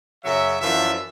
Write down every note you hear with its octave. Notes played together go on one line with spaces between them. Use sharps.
F#2 C#3 F#3 E5
F#2 E3 F3 D4 E5